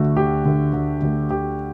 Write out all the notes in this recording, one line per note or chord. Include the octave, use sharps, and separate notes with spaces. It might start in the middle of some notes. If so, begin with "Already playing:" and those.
Already playing: D2 D3 A3 F#4
D2 G4
D3 A3
D2
D3 A3
D2 G4